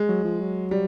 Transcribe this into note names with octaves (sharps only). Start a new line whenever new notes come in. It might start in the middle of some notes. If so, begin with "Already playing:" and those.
Already playing: G#3
F#3
F3
F#3
G3